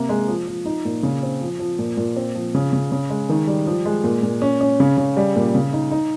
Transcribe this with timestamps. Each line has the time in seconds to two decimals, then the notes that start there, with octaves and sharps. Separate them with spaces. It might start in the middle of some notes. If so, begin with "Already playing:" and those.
Already playing: C3 A#3
0.09 G#3
0.28 F3
0.48 F3
0.65 D#4
0.85 A#2
1.03 C#3
1.23 C4
1.42 F3
1.60 F3
1.79 A#2
1.97 A#2
2.16 C4
2.35 F3
2.54 C#3
2.73 C#3
2.92 C#3
3.10 G#3
3.29 D#3
3.47 G3
3.67 F3
3.86 G#3
4.04 A#2
4.23 A#2
4.42 C#4
4.61 C#4
4.80 C#3
4.98 C#3
5.17 G3
5.36 A#2
5.55 C#3
5.73 D#4
5.91 D#4